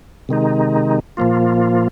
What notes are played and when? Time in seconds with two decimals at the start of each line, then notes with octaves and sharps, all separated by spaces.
0.29 C3 D#3 G#3 D#4
1.17 A#2 F3 A#3 F4